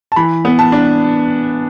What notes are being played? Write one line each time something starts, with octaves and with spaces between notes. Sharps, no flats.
A5
E3 B5
B3
A5
D4